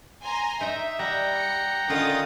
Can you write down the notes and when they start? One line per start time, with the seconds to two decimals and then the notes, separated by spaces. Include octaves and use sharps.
0.22 G#5 A#5 C6
0.61 D#4 E5 G5 A#5
0.99 G3 F#5 G5 A#5
1.34 C#7
1.89 D3 D#3 C#4 F4 D#6 A6